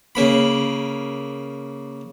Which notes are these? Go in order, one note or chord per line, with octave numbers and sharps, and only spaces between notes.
C#3 A#3 B5